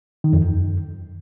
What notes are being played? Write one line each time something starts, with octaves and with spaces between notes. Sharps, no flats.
D#3
F2
F#2